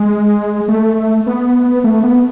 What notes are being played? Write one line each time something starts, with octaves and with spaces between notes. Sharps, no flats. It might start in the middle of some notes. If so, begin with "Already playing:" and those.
Already playing: G#3
A3
B3
A3
B3